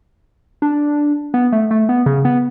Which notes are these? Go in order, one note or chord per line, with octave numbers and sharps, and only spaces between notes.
D4
B3
A3
A3
B3
C#3
B3